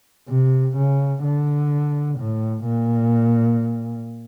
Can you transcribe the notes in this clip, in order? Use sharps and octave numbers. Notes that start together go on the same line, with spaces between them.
C3
C#3
D3
A2
A#2